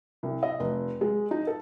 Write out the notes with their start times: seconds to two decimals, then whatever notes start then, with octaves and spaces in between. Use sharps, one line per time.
0.23 C2
0.43 D#5
0.60 F1
1.01 G#3
1.31 D#4
1.47 A4